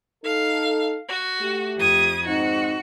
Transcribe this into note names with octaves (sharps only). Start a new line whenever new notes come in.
D#4 A4 F5
F#4
A3 G4
F2 D#6 G#6
G#2 C4 D#4 F#4